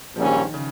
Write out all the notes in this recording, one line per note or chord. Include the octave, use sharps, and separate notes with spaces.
A#1 G#2 F3 G3 A#3 C#4
D#3
C#3